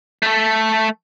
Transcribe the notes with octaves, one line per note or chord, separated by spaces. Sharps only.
A3 A4